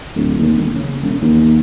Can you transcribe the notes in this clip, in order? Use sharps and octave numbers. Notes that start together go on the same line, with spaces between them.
D1
D#2
E1
C#3
E1
D#2